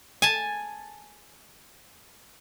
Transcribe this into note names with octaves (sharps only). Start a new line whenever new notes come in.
G#5 A5